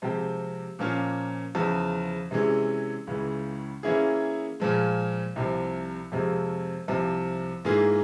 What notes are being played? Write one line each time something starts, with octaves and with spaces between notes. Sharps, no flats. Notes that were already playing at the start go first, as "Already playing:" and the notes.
C3 F3 G#3 C4 G4
A#2 F3 A#3 C#4 F4
E2 C#3 F3
C3 E3 G#3 C#4
C#2 C#3 E3 G#3
E3 A#3 C#4 E4 G#4
A#2 F3 G#3
C2 C3 F3 C4
F2 C3 F3 G#3
C2 C3 F3
G#2 E3 A#3 F4 G#4